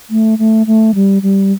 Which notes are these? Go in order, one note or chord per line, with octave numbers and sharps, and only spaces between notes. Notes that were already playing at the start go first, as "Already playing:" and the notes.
A3
A3
A3
G3
G3